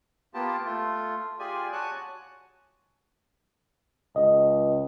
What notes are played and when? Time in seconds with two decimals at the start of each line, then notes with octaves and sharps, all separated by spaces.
0.34 A#3 B3 F4 G4 A5
0.65 A3 F4
1.39 F4 G4 G#4 D5 G#5
1.72 F#4 C#5 G#5 A5 F#6
4.16 C#2 D#5